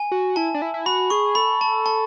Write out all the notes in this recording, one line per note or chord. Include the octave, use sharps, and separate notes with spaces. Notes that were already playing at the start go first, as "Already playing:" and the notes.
Already playing: G#5
F#4
E4 A5
D4
E4
E4
F#4 B5
G#4 C#6
A4 B5
A5
A5